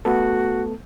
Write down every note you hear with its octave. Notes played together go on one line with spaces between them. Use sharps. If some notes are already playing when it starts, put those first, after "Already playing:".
A3 B3 F#4 A4